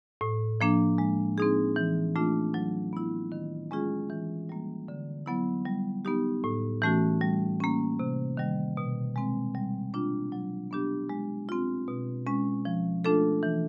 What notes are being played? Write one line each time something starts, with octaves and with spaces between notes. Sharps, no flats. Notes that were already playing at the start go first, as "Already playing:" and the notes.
A2
F3 A#3 D4
G#3
C4 D#4 G#4
E3
A3 D4 F4
F#3
B3 E4
D#3
G#3 C#4 F4 G#4
E3
G3 A#3
D3
F#3 B3 E4
G3
B3 D#4 G4
A2
E3 A3 C#4 F#4
G3
A#3 C#4
C3
D#3 G3
B2
G#3 C4
G3
A#3 D4 F4
F#3
B3 D4 G4
G#3
C4 F4
B2
G#3 C#4
F3
A3 D4 F4 A4
E3